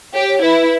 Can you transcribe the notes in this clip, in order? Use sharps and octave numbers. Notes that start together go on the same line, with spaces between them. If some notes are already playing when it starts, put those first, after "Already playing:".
G4 C#5
C#5
E4 B4